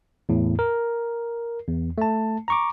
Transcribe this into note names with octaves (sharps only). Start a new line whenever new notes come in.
E2 A2
A#4
E2
A3 A5
A#5 C#6 D6